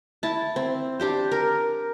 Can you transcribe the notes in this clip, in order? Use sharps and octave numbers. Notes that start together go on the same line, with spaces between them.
E4 A5
C4
D4 G4 C5
A#4